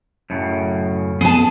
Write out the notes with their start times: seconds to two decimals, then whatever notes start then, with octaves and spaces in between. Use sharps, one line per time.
0.30 F#2 A2 C#3
1.21 B3 G#4 A5